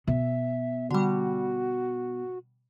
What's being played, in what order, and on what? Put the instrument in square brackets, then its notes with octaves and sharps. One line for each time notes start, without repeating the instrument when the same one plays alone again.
[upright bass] B2 [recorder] E5
[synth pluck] D3 G3 [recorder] F#4